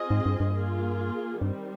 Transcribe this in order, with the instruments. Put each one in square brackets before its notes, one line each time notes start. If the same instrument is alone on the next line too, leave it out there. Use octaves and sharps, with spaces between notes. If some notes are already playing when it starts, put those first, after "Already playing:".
Already playing: [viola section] C4 F4 G#4 D#5
[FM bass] G#2
G2
G2
[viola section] A#3 F4 G#4
[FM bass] G2 [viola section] D#3 G3 C4